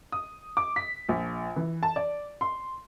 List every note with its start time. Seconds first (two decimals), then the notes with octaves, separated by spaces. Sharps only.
0.12 D#6
0.57 D6
0.76 B6
1.09 A#1
1.56 E3
1.83 A5
1.96 D5
2.41 C6